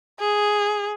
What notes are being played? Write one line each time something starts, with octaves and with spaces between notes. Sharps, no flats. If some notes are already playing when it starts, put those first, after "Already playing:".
G#4